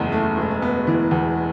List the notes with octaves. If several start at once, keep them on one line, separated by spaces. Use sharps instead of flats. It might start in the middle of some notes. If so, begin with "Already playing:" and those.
Already playing: F#1 E2 C#3 A3
A3
E1
B3
E3
E2